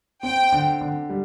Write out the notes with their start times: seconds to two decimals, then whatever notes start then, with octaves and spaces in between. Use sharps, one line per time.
0.23 C4 G5
0.52 D3
0.81 D3
1.10 G3